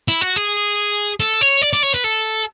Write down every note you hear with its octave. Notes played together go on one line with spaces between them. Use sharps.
E4
F#4
G#4
A4
C#5
D5
D5
C#5
B4
A4